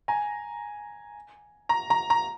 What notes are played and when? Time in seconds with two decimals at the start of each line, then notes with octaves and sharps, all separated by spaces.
0.08 G#5 A#5
1.69 A#5
1.90 A#5
2.10 A#5